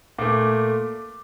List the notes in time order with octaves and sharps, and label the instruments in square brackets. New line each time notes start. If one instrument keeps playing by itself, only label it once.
[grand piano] A#2 A3 D6